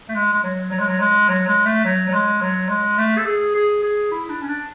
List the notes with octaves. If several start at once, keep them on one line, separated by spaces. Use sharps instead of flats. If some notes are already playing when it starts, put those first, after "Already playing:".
A3
G#3
G#3
F#3
F#3
G#3
F#3
G#3
F#3
G#3
A3
F#3
F#3
G#3
F#3
G#3
A3
A4
G#4
G#4
G#4
E4
D4
C#4
D4